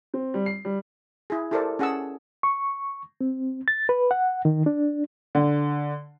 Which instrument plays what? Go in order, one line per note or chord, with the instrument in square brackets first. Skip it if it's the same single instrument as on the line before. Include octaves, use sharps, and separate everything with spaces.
[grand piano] C4
G3
C7
G3
[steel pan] E4 G#4
E4 G4 A4 A#4 C5 D5
C#4 G#4 F#5 A5 E6
[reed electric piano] C#6
C4
A6
B4
F#5
D#3
D4
[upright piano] D3